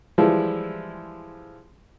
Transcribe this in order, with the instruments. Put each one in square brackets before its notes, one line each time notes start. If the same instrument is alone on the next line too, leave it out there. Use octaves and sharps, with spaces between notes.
[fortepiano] E3 F3 G3 G#3 E4